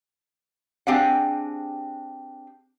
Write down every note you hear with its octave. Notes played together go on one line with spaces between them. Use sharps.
C4 D4 G4 G#4 F5 F#5